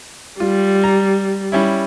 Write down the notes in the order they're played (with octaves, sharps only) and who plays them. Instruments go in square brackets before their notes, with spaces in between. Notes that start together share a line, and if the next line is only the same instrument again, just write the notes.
[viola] G3 [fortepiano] F4
[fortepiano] A#5
G3 C#4 E4